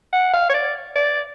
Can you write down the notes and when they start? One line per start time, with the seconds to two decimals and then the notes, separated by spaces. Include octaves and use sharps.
0.13 F#5
0.34 F5
0.50 C#5
0.54 D5
0.96 D5